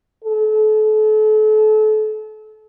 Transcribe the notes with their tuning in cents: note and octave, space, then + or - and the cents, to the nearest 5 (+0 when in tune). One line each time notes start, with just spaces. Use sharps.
A4 -35